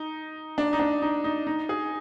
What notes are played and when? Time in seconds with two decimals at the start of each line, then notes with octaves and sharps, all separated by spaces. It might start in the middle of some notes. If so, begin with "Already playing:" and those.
Already playing: D#4
0.58 D4
0.73 D#4
0.80 D4
1.02 D#4
1.24 D#4
1.47 D#4
1.69 G#4